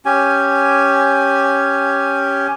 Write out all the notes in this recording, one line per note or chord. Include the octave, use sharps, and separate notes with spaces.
C#4 G4 G#5